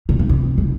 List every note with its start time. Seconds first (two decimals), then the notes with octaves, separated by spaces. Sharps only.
0.09 C3
0.19 C3
0.29 C3
0.58 C#3